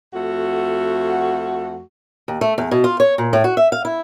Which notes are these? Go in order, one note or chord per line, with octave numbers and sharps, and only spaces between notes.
F2 A3 F#4
D#2
A3
E2
B2
F4
C#5
A#2
A2
F#4
E5
F5
E4